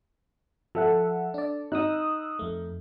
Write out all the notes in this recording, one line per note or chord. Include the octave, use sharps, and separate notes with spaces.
F3 A4 E5 F#5
D4 D5
D#4 D#6 E6 F#6
F2 A3